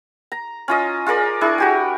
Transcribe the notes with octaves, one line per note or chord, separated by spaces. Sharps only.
A#5
C#4 F4 D#5
F4 G#4 A#4 D5
D4 E4 G#4 C#6
F#4 G4 G#5